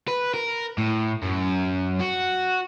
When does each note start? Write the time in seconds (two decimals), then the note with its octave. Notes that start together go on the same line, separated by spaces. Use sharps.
0.08 B4
0.34 A#4
0.78 A2
1.23 F#2
2.01 F#4